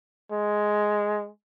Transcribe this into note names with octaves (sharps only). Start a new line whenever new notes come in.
G#3